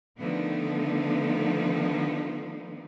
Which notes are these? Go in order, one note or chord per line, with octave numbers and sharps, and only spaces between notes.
D3 D#3 F3 A3 B3 D#4